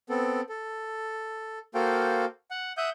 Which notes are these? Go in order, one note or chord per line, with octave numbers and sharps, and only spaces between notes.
B3 C4 A4
A4
A#3 F#4 A4 C5 F5 G5
F#5
E5 F#5 D#6 G6